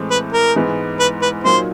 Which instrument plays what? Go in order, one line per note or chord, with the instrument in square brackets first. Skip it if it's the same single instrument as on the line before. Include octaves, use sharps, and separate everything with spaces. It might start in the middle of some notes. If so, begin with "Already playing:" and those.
Already playing: [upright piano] A2 E3 G#3 C4
[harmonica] B4
A#4
[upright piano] G#2 E3 G#3 B3
[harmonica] B4
B4
[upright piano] A#2 F#3 A#3 D#4 [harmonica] C5